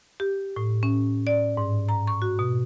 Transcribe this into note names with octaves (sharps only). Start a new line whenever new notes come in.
G4
A2
C#4
D5
G#2
A#5
C#6
F#4
B2